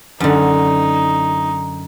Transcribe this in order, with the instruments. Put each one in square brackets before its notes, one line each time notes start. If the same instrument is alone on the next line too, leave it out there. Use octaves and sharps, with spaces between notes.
[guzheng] F#2 D3 [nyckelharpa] D#4